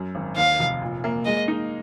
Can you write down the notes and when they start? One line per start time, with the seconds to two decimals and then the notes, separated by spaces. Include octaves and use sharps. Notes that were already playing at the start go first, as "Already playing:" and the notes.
Already playing: F#2
0.15 G#1
0.36 D#2 F5
0.59 F1
0.82 A#2
1.04 A#3
1.26 G#3 D#5
1.48 D#4